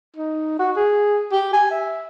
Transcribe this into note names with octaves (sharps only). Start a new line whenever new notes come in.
D#4
F#4
G#4
G4
G#5
E5